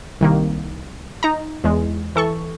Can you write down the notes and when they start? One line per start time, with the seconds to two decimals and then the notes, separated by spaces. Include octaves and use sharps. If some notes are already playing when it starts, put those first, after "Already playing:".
0.21 C2 D#3 A#3
1.23 D#4 A#5
1.64 E2 G#3
2.15 E3 A4 C#6